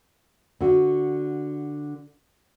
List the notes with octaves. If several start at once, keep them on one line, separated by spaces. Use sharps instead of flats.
D3 F#4